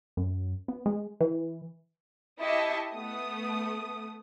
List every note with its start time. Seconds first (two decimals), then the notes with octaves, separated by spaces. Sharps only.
0.17 F#2
0.68 B3
0.86 G#3
1.21 E3
2.41 E4 G4 D#5 E5 A5 C#6
2.93 A3 B3 D#6